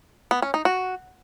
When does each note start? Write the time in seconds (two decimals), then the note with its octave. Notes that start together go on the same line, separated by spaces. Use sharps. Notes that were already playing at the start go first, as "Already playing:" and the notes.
0.31 B3
0.42 C#4
0.54 D#4
0.65 F#4